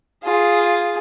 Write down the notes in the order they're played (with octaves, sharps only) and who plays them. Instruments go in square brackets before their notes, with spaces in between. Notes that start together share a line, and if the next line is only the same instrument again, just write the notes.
[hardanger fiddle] F4 G#4